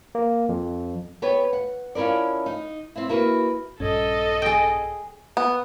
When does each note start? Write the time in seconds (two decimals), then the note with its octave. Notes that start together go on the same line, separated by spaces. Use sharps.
0.15 A#3
0.49 F2
1.22 B3 G4 B4 C#5
1.53 F#5
1.95 F3 C#4 E4 A#4 D5
2.46 D#4
2.96 C4 E4
3.09 A#3 E4 F#4 A#4 B4
3.80 A#1 G2 C#4 A4 D#5
4.42 G#4 G5
5.37 B3